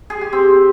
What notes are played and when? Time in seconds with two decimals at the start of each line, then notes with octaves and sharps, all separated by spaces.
0.10 G#4
0.21 G4
0.33 C4